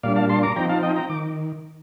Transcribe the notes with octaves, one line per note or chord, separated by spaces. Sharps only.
A#2 G3 D4 D5 F5
F5 A5
A5 C6
A#5 D6
F3 C4 D#4 G5 A#5
F5 A5
D#5 G5
G5 A#5
D#3 D6